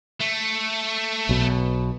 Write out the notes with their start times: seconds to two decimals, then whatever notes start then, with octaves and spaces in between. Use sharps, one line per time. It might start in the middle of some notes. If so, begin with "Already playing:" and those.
0.21 A3
1.29 B1 B2